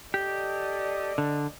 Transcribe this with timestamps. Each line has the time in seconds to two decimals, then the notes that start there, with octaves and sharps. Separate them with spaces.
0.14 G4 A4 D5 D#5
1.18 D3